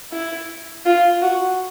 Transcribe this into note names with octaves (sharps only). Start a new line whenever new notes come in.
E4
F4
F#4